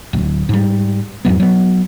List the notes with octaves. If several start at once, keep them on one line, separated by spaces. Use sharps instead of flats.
D1
G#2 G3
F2 G#2 F#3 B3
F#3 B3